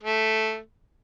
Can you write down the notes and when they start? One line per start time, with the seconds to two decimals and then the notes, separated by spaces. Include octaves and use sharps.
0.03 A3